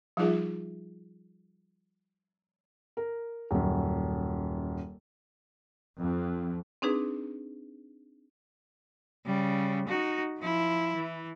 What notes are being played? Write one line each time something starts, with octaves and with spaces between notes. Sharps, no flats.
F3 G3 D#4 F4 G#4 E5
A#4
D#1 F#2
F2
C4 D4 D#4 G#4 B4
C#3 G3
D#4 F#4
F3 E4
E3